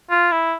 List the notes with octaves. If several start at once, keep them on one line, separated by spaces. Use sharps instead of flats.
F4
E4